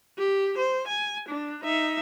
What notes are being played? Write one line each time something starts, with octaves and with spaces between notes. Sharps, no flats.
G4
C5
G#5
D4
D#4 E5